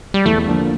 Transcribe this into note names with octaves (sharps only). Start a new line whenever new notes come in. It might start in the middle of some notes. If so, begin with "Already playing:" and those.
G3
E2 A3
D3 F3 A#3